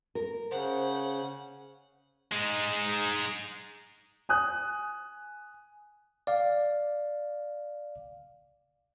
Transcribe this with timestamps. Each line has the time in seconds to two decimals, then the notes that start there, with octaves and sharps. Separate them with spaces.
0.15 A#4
0.51 C#3 C5 F#5
2.32 G#3 D#4
4.29 G#5 D#6 F#6
6.27 D5 F5